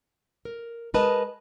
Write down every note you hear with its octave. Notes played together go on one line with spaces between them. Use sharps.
A#4
G#3 A#4 B4 D#5 A5